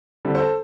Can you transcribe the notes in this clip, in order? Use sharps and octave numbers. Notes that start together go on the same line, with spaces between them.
D3 G3 C4 E4
A4 C5